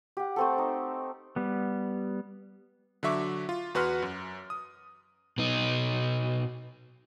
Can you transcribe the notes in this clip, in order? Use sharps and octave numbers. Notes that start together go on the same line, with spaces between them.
G4 F#5
A3 C4 A4
D#4
G3 B3
D3 F#3 E5 C#6 D6
F4
E2 F#4 B4 F#5 C6 F6
F#2
D#6
B2 D#4